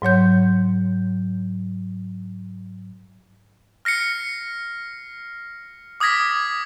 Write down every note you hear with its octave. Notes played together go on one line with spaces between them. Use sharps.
G#2 F#3 C#5 G6
F6 A#6 C7 C#7
D6 D#6 F6 G#6 A#6 B6